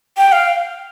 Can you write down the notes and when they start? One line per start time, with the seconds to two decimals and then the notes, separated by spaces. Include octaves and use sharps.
0.18 G5
0.32 F5